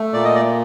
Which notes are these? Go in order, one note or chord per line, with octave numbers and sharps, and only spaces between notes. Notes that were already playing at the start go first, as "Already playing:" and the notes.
Already playing: A3
A#2 D5
D#5
D5